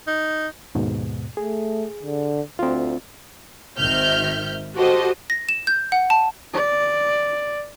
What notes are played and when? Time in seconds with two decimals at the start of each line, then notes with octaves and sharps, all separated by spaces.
0.07 D#4
0.75 D#2 G#2 B2
1.37 A3 G#4
2.03 D3
2.59 D2 C4 F4
3.78 G#1 D#3 C4 E5 F6 G6
4.75 F#4 G4 A4 C5 D#5
5.30 A#6
5.49 E7
5.67 G6
5.92 F#5
6.10 A5
6.53 D5